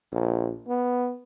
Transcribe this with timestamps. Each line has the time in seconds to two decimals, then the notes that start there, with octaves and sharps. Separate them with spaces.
0.12 A#1
0.68 B3